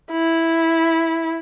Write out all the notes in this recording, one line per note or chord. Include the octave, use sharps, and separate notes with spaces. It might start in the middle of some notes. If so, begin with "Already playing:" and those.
E4